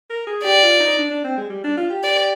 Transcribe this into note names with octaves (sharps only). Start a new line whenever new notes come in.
A#4
G#4
G4 D5
F4
D#4
D4
D4
C4
G#3
G3
D4
F4
G4
D5